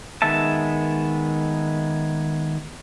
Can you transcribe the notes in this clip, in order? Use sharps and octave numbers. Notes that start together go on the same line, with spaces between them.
D#3 G#3 B3 E5 A5